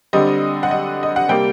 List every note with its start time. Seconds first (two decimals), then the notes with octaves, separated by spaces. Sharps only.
0.13 D3 G3 C4 D#5
0.63 F#5
0.71 D#5
1.03 D#5
1.16 F#5
1.29 C3 G3 A#3 G5